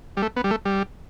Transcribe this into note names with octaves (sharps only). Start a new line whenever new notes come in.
G3
A3
B3
G3
A3
G3